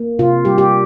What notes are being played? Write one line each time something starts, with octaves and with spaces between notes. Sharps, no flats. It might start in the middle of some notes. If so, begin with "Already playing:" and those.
Already playing: A#3
C3 F4
G3 G4
G4